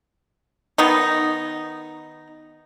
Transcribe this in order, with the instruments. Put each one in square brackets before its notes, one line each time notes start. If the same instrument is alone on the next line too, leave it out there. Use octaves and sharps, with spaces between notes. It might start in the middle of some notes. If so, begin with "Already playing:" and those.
[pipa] D#3 B3 D#4